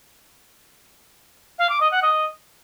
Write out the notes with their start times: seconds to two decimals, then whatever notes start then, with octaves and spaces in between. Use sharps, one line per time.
1.59 F5
1.70 D6
1.80 D#5
1.91 F#5
2.02 D#5